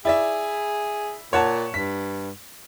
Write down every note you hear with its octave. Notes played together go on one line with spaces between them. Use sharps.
E4 G#4 D5 E5
A#2 C#5 F#5 A5
G2 B6